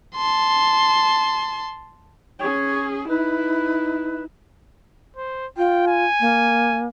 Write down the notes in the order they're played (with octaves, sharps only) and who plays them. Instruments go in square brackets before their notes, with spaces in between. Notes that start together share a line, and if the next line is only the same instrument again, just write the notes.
[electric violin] A5 C6
[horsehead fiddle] C#4 G#4 [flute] C#5
[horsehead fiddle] D#4 E4 [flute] B4
[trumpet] C5
[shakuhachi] F4 [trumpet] G5
[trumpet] G#5
[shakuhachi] A#3